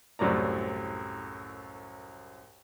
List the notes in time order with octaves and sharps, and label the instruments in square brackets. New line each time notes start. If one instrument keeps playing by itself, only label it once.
[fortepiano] C2 F#2 A2 D5 A#5